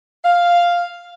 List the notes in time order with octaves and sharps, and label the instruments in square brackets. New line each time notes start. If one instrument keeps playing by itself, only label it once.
[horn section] F5